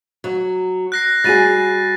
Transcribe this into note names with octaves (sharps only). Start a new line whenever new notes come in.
F#3
F#6 A#6 C7
G3 F#4 G#4 A6 D#7